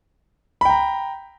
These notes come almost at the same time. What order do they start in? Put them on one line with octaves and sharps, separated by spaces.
B5 G5 A#5